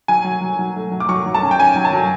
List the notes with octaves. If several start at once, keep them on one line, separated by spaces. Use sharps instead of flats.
F#3 G#5
F#3
F#3
F#3
A3
F#3
D6
F#3 C#6
F#3
A5
C#4
G5
C#4 G#5
F#3
A5
F#3